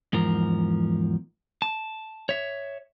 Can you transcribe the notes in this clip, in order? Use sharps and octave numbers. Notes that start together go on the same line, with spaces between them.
E2 G#2 F3 A#4
A5
C#5 E5